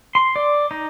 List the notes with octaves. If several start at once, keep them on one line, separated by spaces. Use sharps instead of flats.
C6
D5
D#4